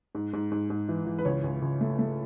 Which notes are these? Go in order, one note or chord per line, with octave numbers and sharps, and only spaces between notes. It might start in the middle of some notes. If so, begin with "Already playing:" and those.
G#2
G#2
G#2
G#2
E3
E3
B4
C#2 C#5
C#2
C#2
A3
A3